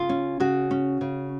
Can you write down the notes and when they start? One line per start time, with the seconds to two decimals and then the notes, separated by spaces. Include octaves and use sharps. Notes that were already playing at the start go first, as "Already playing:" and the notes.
Already playing: C#3 F4
0.09 C#4
0.40 C#3 F#4
0.71 C#4
1.01 C#3